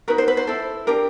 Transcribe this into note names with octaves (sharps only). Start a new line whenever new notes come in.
D#4 F#4 A#4 B4
C5
B4
C5
E4 A4
D4 G4 A#4